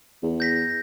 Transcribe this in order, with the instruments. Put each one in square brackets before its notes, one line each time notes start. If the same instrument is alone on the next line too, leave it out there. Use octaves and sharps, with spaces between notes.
[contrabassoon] E2
[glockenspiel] G6 A#6 B6